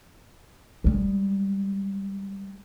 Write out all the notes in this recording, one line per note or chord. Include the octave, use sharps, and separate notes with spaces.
G3 G#3